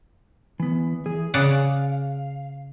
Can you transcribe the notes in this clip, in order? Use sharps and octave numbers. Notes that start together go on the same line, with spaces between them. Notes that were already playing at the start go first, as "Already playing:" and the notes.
E3 B3
E3 G#4
C#3 D5 F5 F#5